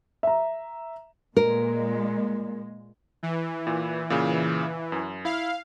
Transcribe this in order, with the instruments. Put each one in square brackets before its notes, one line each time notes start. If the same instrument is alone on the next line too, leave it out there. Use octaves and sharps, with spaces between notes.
[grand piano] E5 A#5
[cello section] A#2 G#3 [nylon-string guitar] A#4
[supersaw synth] E3
[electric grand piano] A#2
A#2 C#3
F#2
[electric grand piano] E4 [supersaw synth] F5